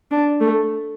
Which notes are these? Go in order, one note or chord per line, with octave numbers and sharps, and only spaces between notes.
D4
A3